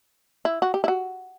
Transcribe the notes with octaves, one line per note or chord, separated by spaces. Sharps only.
E4
F#4
G4
E4
F#4